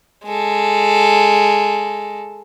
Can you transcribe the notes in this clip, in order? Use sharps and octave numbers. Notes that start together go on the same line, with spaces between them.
G#3 A4